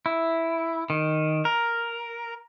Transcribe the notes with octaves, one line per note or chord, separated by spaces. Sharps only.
E4
D#3
A#4